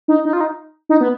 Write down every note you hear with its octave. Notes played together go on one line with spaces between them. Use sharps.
D#4
D#4
F4
D#4
D#4
B3